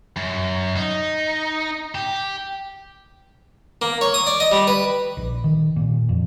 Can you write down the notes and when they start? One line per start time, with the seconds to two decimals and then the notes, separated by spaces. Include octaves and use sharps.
0.16 F#2
0.76 D#4
1.95 G4
3.82 A#3
4.01 C#5
4.14 D#6
4.27 D5
4.40 D#5
4.52 G3
4.67 B4
5.17 A#1
5.44 D#3
5.76 A#2
6.09 F2